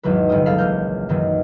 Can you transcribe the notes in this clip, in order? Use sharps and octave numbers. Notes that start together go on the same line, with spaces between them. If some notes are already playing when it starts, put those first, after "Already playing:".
G#1 E2 D#3 F#3 B4
G1 C3 F4 D#6
C#2 A#3 G#4 A4 F5 B5
A#1 E3 G#4 A#4 F6 G6
F#2 D#3 E3 F#3